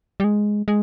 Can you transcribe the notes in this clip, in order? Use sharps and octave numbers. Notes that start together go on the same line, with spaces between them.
G3
G#3
G#3